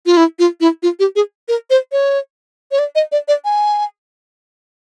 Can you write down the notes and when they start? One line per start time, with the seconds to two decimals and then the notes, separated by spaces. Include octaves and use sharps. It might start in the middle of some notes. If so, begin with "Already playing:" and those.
0.06 F4
0.17 E4
0.39 F4
0.61 E4
0.83 F4
0.99 G4
1.16 G#4
1.48 A#4
1.70 C5
1.92 C#5
2.71 C#5
2.79 D5
2.95 D#5
3.12 D5
3.28 D5
3.45 G#5